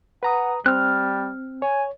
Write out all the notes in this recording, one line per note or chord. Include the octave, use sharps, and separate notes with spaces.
B4 F#5 A#5 D#6
G3 C4 F6 F#6
C#5 G#5